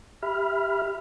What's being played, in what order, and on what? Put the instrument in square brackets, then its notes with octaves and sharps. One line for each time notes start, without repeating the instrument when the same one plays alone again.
[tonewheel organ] G4 E5 B5 F6